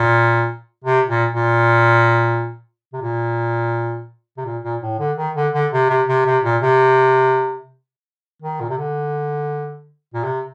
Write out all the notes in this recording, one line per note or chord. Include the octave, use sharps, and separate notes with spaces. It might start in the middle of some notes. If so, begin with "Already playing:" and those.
Already playing: A#2
C3
A#2
A#2
C3
A#2
C3
A#2
A#2
A2
D3
D#3
D3
D3
C3
C3
C3
C3
A#2
C3
D#3
A#2
C3
D3
A#2
C3